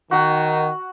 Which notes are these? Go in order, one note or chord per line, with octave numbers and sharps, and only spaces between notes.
D#3 F#4 F#5